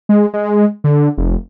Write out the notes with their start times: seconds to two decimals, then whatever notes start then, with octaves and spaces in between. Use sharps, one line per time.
0.09 G#3
0.34 G#3
0.84 D3
1.18 F1